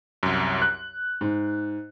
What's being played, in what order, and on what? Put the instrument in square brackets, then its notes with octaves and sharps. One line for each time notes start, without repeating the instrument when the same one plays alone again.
[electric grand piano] C2 F#2
F#6
[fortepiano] G#2